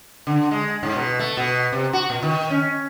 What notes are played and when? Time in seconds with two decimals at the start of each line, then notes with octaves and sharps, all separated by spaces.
0.27 D3
0.51 G#3
0.83 G#2
0.96 B2
1.19 A3
1.37 B2
1.72 C3
1.93 F#4
2.10 A#2
2.23 D#3
2.50 C#4